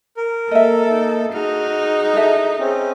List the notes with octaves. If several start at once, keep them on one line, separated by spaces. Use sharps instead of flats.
A#4
A#3 A4 D#5 E5
D#4
D#4 F#4 G#4 F6
E4 A4 E5
C4 C#4